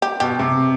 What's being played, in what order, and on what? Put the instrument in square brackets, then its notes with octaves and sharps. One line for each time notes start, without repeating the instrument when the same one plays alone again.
[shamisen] G4
[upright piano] B2 [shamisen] G4
[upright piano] C3